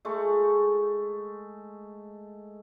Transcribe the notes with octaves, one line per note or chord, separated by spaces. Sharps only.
G#3 A3